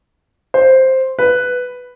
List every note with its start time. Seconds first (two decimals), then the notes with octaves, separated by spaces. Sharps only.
0.54 C5
1.19 B4